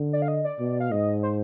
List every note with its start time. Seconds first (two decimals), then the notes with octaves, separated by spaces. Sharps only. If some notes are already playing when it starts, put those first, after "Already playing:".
Already playing: D3
0.13 D5
0.22 F5
0.28 D#5
0.45 D5
0.59 B2
0.80 F5
0.91 G#2 D#5
1.23 C5